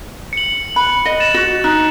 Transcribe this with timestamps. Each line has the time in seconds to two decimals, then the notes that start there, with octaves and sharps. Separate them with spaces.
0.33 C#7 F#7
0.76 B5 F#6
1.05 D#5
1.20 A6 C#7 E7
1.34 F#4
1.64 D#4 F#6